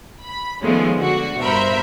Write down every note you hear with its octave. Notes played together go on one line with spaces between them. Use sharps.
B5
D#3 F3 G#3 A3 B3 C#4
D3 F#4
G2 B2 A#4 C5 E5 B5